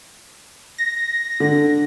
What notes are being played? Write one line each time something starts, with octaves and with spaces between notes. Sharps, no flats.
A#6
D3